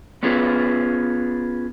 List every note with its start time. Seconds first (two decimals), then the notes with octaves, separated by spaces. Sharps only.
0.23 B3 C#4 F4 G#4 B4